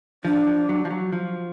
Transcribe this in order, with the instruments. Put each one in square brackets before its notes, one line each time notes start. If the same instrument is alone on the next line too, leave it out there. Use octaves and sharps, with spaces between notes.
[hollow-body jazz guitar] F3 [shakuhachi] D4
[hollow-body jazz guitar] F3
F#3
F3
F#3
F3